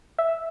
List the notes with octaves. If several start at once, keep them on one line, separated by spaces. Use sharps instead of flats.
E5